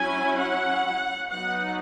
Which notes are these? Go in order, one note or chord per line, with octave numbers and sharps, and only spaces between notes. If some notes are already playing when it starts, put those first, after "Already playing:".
Already playing: F#3 C#4 E4 G#5
F#5
F#3 B3 D#4 F#5